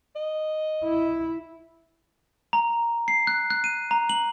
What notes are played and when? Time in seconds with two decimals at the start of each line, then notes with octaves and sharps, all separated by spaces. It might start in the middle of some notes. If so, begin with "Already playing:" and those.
0.16 D#5
0.84 E4
2.53 A#5
3.08 C7
3.27 F#6
3.50 F#6
3.64 D#7
3.91 A#5
4.09 F#7